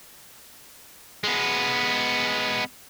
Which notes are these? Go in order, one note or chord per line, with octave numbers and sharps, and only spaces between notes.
G#3 B3